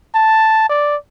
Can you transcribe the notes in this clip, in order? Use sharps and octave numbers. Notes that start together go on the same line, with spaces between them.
A5
D5